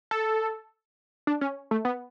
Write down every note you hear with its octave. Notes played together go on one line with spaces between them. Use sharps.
A4
D4
C#4
A3
B3